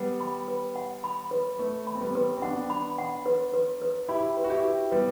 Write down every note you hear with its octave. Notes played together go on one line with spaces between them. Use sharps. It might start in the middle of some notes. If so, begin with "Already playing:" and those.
Already playing: G3 B3 F#5
B5
B4
F#5
B5
B4
A3 B4
B5
C4
G3 B3
B4
C4
B3 D4 F#5
B5
F#5
B4
B4
B4
E4 G4 B5
B4
F#4
E4 G4
B4
G3 B3 B4